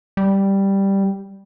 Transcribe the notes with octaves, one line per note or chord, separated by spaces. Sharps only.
G3